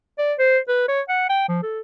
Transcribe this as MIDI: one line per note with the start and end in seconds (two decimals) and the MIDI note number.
0.18 0.33 74
0.39 0.59 72
0.68 0.86 71
0.88 1.01 73
1.09 1.26 78
1.29 1.45 79
1.48 1.61 53
1.63 1.80 69